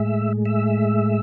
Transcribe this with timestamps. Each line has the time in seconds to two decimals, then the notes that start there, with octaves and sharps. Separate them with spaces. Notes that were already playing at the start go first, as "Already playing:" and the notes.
Already playing: A2 G#3 E5
0.45 E5